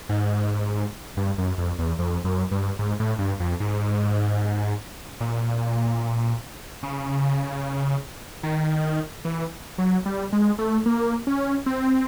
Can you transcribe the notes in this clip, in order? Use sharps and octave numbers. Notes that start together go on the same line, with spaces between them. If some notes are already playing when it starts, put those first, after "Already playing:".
G#2
G2
F#2
F2
E2
F2
F#2
G2
G#2
A2
G2
F2
G#2
A#2
C#3
D#3
E3
F#3
G3
G#3
A3
A#3
C#4
C4